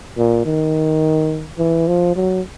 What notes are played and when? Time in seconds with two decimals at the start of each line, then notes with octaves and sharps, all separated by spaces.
0.17 A#2
0.45 D#3
1.58 E3
1.87 F3
2.15 F#3